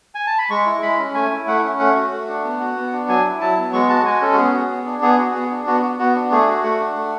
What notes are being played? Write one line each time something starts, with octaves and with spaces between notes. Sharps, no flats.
G#5
A5
B5
G#3 C#6
E4
G#3 B5
C#4
A3 G#5
E4
A3 F#5
C#4
A3 F#5
F#4
A3
D4
B3
F#4
B3
D4
F#3 G#5
E4
F#3 A5
B3
G#3 C#6
F#4 A5
G#3 G#5
C#4 A4
F#4
B3 G#4
F#4
B3
D4
B3 G#4
F#4
B3
D4
B3 F#4
F#4
B3 F#4
D4
A3 G#4
F#4
A3 F#5
D4
A3